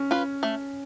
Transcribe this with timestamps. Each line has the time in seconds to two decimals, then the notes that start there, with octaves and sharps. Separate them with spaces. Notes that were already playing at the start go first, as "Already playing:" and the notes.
Already playing: C#4
0.11 F4 B4
0.43 A3